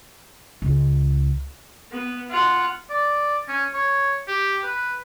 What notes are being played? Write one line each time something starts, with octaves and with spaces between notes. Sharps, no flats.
C#2
B3
F4 F#5
D5
C#4
C#5
G4
B4